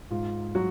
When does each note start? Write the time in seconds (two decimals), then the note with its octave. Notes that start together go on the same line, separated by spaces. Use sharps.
0.11 G#2 F4
0.55 F#3 F#4